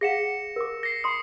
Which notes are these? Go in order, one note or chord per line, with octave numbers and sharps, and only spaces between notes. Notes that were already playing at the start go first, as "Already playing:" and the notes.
G#4 F5 F#5 A#6 C#7 E7
A#4 D6
A#6 C7
A5 B5 C6 D#6 C7